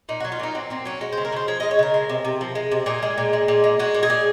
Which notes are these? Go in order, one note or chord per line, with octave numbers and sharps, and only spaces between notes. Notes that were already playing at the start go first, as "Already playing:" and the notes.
A#2 D#4
F#3 F#4
F4
A#2 D#4
F#3 C4
A#2 C4
F#3 C#4
G#3 F#4
C5
C#3
A#4
C#3 C5
F3 C#5
G#3 D#5
C#5
C#3 A#4
G#3
C3
C3
F3
G#3
C3
A#2 G#4
G#3
A#2
G#3
A#2
G#3
G#3 F#4
A#2
G#4
A#2